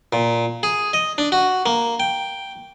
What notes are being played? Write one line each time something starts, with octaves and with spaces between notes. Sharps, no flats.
A#2
G#4
D#5
D4
F#4
A#3
G5